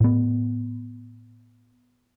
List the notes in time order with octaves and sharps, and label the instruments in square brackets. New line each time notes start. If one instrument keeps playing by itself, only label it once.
[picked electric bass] A2 B3